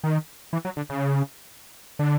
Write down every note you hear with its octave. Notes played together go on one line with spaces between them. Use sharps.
D#3
E3
F#3
D3
C#3
D3